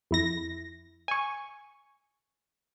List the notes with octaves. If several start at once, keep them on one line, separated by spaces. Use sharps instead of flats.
F2 E4 A#6
G#5 C#6